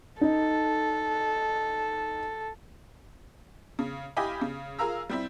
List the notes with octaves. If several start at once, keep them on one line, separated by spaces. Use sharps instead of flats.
D#4 A4
C#3
E4 G4 D#5 F5 G#5 B5
C#3
F4 G#4 A#4 F5 A#5 E6
G3 C4 E4